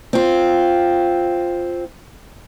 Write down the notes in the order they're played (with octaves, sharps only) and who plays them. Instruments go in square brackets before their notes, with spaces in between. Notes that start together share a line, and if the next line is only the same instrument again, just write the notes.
[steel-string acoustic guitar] C4 F4